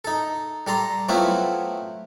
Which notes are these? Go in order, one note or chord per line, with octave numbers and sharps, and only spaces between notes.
D#4 A4
G3 A4 A#5 C6
F#3 A3 B3 C4 E4 F4